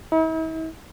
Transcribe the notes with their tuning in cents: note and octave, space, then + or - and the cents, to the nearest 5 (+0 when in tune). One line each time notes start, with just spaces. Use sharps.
E4 -45